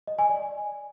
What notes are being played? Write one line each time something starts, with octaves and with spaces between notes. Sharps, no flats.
D#5
G#5
D5